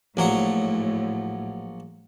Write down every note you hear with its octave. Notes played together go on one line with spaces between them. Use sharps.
A#1 A2 F#3 F#4